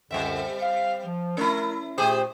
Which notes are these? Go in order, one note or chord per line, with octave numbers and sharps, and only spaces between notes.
C#2 F#2 D3 G3 C4 E5
F5
F3
A3 C#4 E4 A#4
A#2 A3 G4 G#4 C5